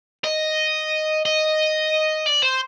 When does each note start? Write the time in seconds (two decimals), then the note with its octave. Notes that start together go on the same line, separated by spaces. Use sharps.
0.24 D#5
1.26 D#5
2.26 D5
2.43 C5